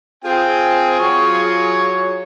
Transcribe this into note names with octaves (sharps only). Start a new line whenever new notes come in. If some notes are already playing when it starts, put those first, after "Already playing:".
C4 F4 G#4 G5
F#3 C#5 C#6